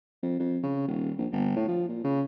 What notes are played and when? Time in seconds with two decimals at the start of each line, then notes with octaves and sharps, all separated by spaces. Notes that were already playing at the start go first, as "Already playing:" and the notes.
0.22 F2
0.39 F2
0.63 C#3
0.87 D#1
1.18 A#1
1.32 G1
1.56 A2
1.68 F3
1.88 A#2
2.04 C#3